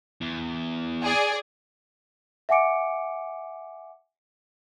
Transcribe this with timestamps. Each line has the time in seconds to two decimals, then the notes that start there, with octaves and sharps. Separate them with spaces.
0.21 E2
1.03 G#4 D5
2.49 E5 F#5 G#5 D6 C#7 D7